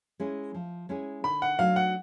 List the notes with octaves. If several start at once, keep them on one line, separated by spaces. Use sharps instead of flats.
G#3 C#4 E4 G#4
F3
G#3 C#4 E4 G#4
D3 B5
F#5
F#3 A3 D4 F#4 F5
F#5